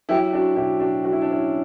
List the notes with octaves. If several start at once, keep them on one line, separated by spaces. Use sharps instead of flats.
F#3 E4 G4
D4 F#4
B2 E4 G4
D4 F#4
F#3 F#4
E4
D4
C#4 E4